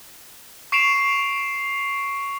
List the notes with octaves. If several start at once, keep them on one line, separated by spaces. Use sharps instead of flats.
C#6 C7 D7 E7 F7